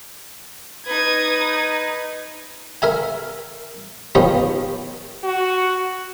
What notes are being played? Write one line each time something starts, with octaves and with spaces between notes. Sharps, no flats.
D#4 B4 D#6 G#6
A#4 E5 G#5
D#3 F3 B3 C#4 D#4 G4
F#4